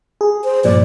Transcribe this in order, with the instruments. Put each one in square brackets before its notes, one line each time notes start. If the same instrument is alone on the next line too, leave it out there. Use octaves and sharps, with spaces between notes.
[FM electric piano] G#4
[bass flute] C5
[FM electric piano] G2 A#2 F3 [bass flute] D5